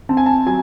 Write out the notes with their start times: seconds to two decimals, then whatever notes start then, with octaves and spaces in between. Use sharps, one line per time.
0.09 C4 A5
0.17 G#5
0.26 A5
0.46 F#3 G#5